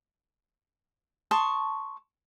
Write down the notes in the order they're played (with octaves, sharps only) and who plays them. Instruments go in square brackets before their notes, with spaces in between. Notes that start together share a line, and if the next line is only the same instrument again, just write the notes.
[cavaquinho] A5 C6 C#6 D#6